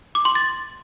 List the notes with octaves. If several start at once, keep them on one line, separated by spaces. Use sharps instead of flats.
D6
C6
A6